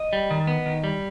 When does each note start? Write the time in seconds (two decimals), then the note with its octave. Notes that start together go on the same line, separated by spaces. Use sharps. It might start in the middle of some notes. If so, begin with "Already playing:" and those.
Already playing: D#5
0.13 G3
0.31 D#3
0.47 B3
0.66 D#3
0.84 G3